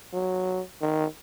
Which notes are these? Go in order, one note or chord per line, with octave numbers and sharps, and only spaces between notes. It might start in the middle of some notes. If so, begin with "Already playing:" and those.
F#3
D#3